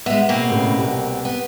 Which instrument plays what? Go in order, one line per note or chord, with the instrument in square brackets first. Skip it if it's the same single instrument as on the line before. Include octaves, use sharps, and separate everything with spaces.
[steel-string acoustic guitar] G#3 B3 [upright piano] E5
[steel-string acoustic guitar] B2 A#3 C4
[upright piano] A2 C#3
C2
[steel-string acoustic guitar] B3